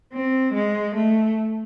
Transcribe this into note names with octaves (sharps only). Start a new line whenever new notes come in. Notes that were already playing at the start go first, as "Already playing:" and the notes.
C4
G#3
A3